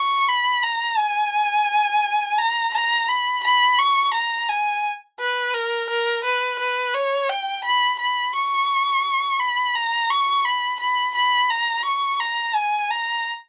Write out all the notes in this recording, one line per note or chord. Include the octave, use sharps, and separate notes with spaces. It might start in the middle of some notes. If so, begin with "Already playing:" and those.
Already playing: C#6
B5
A#5
G#5
A#5
A#5
B5
B5
C#6
A#5
G#5
B4
A#4
A#4
B4
B4
C#5
G5
B5
B5
C#6
B5
A#5
C#6
B5
B5
B5
A#5
C#6
A#5
G#5
A#5